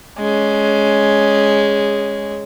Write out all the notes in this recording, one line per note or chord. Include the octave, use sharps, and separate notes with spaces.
G#3 C#4